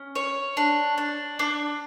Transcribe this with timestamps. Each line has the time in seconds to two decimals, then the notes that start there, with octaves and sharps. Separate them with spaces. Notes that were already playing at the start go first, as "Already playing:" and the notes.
Already playing: C#4
0.15 C#5
0.57 D4
0.98 D4
1.39 D4